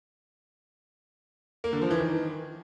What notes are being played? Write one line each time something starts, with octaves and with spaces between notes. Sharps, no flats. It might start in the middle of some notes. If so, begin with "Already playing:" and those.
A#3
D3
F3
E3
D#3